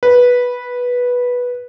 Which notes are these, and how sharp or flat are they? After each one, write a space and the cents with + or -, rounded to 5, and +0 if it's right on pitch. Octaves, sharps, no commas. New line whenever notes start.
B4 -10